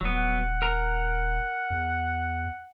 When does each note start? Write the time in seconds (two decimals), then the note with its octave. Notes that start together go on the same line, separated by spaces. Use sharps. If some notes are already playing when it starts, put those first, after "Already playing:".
0.01 D#1 F#3 B3
0.15 F#5
0.62 A#4 A#5
1.70 E2